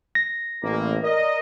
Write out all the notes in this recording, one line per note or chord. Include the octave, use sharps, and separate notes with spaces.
A#6
A1 A#3
A#4 D5 D#5